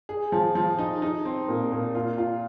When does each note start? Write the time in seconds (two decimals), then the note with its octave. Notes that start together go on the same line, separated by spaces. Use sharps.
0.09 G#4
0.32 F3
0.55 F3
0.79 D#4
1.02 D#4
1.25 C4
1.48 A#2
1.72 A#2
1.95 F4
2.18 F4